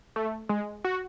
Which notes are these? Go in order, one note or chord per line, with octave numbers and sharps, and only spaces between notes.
A3
G#3
F#4